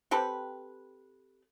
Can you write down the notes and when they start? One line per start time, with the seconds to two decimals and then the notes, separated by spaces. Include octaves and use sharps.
0.11 C4 G4 A4 B4